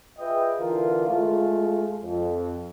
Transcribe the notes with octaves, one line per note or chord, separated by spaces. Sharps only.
F4 G#4 B4 D#5 E5 G5
D3 E3 D4 F4 A#4
G#3 A3 F4
F2